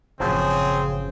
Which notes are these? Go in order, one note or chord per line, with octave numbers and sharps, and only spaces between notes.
G1 A#2 C#3 F3 F#3 C4 G#4